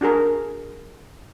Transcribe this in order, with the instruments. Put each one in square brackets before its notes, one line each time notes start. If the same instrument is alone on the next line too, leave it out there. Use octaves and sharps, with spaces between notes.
[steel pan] D4 F#4 G#4 A#4